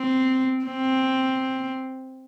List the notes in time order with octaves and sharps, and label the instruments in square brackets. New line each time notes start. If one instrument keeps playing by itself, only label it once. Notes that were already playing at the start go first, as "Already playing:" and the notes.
Already playing: [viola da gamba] C4
C4